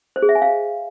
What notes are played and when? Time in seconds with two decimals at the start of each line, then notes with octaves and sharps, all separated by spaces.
0.16 C5
0.22 G#4
0.29 E5
0.35 G#5
0.42 F5